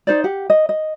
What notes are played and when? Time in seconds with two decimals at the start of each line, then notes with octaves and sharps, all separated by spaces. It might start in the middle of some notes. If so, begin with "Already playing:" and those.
0.07 D#4 C5 D5
0.24 G4 F#5
0.50 D#5
0.69 D#5